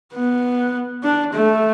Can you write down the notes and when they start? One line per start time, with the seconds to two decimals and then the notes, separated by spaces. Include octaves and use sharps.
0.13 B3
1.03 D4
1.34 A3